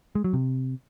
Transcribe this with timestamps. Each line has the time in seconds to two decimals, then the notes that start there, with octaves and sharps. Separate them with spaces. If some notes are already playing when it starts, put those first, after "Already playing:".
0.15 G#3
0.24 F#3
0.33 C3